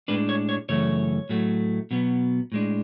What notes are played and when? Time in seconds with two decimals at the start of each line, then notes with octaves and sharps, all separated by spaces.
0.08 A2 G#3 D4 B4
0.29 C#5
0.49 C#5
0.69 F#2 C#3 E3 A3 C#5
1.29 A2 F#3 A3
1.91 B2 F#3 B3
2.52 A2 G#3 D4